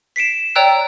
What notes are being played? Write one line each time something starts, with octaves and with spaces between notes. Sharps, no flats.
B6 C7 D7 E7
C#5 D5 G5 A#5 E6 F#6